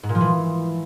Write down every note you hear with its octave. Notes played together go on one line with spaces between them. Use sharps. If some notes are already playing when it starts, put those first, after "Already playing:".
G#2
A#2
F3
E3